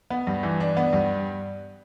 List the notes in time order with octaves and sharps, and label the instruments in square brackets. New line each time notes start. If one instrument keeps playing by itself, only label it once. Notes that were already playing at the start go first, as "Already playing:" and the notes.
[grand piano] B3
G2
E3
D4
B3
G2